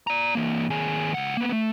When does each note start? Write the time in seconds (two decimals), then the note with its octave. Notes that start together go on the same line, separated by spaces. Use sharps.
0.07 D5 A#5
0.35 E3 A#3
0.70 D#2 G#4
1.14 C#2 F#5
1.37 A#3 B3
1.52 A3